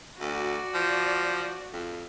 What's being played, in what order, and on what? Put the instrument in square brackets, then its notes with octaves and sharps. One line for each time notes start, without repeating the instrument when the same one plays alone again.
[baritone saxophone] D2 [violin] F#4 D5
[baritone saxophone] F3
F2